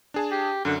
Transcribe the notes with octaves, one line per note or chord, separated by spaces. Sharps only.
D4 G#4 A5
G4
F#2 D3